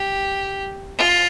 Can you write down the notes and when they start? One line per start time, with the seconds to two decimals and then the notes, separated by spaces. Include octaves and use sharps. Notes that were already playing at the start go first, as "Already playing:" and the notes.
Already playing: G4
0.97 F4